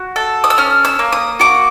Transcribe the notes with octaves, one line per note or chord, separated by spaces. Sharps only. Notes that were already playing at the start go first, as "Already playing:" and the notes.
Already playing: F#4
A4
D#6
E6
C#4 F6
E6
A#3
D#6
F#4 D6